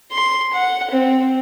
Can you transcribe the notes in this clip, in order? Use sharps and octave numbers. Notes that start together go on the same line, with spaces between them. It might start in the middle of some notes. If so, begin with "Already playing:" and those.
C6
F#5
C4